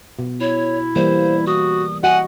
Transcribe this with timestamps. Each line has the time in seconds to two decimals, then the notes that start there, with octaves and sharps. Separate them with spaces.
0.19 B2
0.41 E4 C#5
0.96 E3 G3 A#3 C5
1.47 F#4 D#6
2.03 F#4 D#5 F#5 G#5